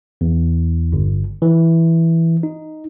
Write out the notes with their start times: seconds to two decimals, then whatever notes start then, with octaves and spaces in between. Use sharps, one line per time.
0.21 E2
0.92 G1
1.42 E3
2.43 D#4